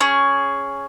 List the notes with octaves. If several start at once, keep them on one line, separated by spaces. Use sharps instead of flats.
C#4 G#4